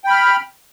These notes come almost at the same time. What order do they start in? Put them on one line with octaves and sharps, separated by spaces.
G5 B5 F6